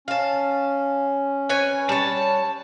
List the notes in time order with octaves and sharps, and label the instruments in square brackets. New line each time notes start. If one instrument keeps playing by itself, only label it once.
[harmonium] C#4 [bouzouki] F5 A5
[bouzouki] B4 C#5 G#5
[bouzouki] G3 C#5 [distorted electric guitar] A5